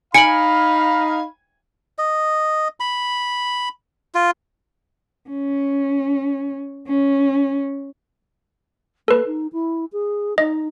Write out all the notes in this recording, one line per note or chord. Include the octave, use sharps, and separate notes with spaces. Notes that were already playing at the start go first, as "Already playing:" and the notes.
D#4 F5 G#5 B5 C#7 D7 F#7
D#5
B5
F4
C#4
C#4
A#3 A4 B4
D#4
E4
G#4
D#4 D#5